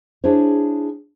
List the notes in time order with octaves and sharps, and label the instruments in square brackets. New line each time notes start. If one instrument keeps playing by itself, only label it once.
[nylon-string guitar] D4 E4 G#4 C5 C#5